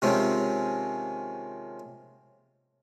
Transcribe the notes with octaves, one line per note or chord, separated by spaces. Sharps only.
C3 D#3 F3 G#3 C4 C#4